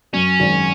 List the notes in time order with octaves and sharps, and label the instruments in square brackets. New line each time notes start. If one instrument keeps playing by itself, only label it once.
[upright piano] F#2 [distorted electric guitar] C#4
[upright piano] G#1